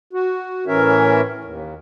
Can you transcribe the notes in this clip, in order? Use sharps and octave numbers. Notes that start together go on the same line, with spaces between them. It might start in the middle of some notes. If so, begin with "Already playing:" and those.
F#4
A2 E3 C#4 A#4 C#5 E5
D#2